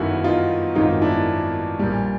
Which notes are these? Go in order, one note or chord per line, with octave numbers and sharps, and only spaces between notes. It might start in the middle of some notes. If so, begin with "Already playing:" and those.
Already playing: G1 F#2 D#3 G3 E4 F#4
D#4 F4
G#1 F#2 D#3 D#4 F4
D4 E4
A#1 A#2 G3